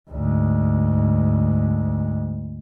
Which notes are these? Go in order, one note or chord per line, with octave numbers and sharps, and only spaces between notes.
D2 G#2